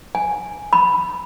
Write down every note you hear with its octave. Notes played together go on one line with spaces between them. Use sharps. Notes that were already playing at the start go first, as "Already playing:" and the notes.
G#5
B5